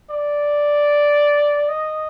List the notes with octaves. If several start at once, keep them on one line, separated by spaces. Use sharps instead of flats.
D5
D#5